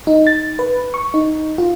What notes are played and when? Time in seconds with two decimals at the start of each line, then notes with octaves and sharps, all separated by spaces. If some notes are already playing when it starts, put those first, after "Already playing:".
0.07 D#4
0.27 A6
0.59 B4
0.94 C#6
1.14 D#4
1.58 F4